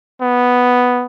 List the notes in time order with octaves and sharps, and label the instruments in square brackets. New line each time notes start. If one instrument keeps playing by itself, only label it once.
[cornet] B3